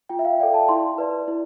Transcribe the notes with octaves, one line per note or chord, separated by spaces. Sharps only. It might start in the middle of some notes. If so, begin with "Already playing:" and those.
F4 G5
E5
F5
A4 D5 G5
A5
E4 C6
B4 D5
E4